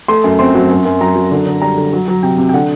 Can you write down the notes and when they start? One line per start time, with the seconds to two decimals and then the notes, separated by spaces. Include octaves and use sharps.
0.08 A3 C6
0.24 F#2
0.39 C4 C6
0.55 F#3
0.70 F#2
0.85 F#2
1.01 F#3 A#5
1.16 F#3
1.31 D3
1.46 D3
1.62 G3 A#5
1.77 D3
1.93 F#3
2.08 F#3
2.23 C3 G5
2.38 C3
2.49 G5
2.54 D3 F#5